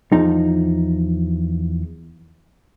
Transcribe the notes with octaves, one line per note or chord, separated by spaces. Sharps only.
E2 F3 D#4